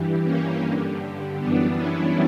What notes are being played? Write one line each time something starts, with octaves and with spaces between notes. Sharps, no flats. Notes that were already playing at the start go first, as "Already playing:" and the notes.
Already playing: G2 E3 G3
A#3 C#4
G2 D3 G3
F#2 E3 G3 B3 D4
C#4 E4